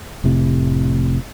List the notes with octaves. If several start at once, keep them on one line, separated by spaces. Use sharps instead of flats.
F1 A2 C3